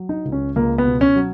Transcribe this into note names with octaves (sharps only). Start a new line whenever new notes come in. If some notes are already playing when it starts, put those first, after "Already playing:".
Already playing: F#3
D#4
C#2
C#4
C#2 A#3
B3
B2
C#4
F#3